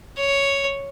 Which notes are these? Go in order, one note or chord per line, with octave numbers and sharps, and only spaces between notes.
C#5